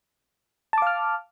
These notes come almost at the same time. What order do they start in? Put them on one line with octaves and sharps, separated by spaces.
A5 D6 F5 F6